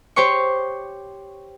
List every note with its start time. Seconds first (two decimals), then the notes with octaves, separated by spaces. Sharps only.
0.16 G4 C5 C#5 C#6